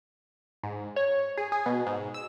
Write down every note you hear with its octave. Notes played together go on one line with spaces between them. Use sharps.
G#2
C#5
G#4
G#4
B2
G#2
E6